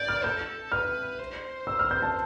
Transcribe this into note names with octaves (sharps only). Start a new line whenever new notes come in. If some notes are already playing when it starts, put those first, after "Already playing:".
Already playing: D5 G6
F6
A4 G6
B4 F6
C5
E6
F6
G6
A5